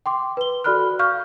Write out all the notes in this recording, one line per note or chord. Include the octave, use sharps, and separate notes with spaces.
G5 C6 D6
B4 G7
F#4 A4 D5 B5 F6 F#6
F5 C#6 F6 G6